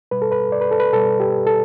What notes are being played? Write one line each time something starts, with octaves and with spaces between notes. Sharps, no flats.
B2 G3 B4
A4
B4
D5
B4
A4
B4
B2 G3 A4
G4
A4